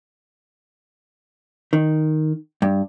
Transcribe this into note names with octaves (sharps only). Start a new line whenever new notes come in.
D#3
G2